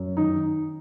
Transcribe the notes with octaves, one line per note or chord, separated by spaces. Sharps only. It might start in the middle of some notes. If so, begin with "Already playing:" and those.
Already playing: F#2
D#3 D#4